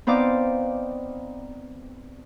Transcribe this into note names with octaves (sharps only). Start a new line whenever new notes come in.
B3 C4 D#4 D5 F5 D6